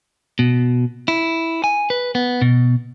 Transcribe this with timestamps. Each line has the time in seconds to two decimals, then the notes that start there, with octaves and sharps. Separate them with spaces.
0.39 B2
1.08 E4
1.64 G#5
1.90 B4
2.15 B3
2.42 B2